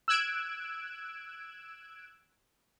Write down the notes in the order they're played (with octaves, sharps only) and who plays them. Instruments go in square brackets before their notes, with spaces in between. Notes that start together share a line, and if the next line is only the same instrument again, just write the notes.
[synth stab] E6 F#6 G#6 D7 E7